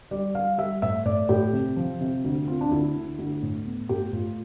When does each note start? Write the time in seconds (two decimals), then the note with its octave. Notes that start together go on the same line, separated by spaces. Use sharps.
0.11 G3 D5
0.35 G3 F5
0.58 G3 E5
0.82 A2 E5
1.05 A2 D5
1.29 A2 G4
1.53 C3
1.76 F3
2.01 C3
2.24 D2
2.48 C4 F4
2.61 D4
2.71 D2 E4
2.95 D3
3.19 D2
3.42 A2
3.65 B3
3.89 A2 G4
4.13 A2 F4